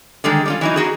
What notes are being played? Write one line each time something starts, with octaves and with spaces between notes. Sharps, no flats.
D3 D#3 G3 G#3
G3 C#4 F4
E3 F#3 D#4
D#4 F#4 G#4